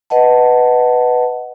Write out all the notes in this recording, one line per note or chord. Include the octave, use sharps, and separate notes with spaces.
B4 D#5 F#5 A5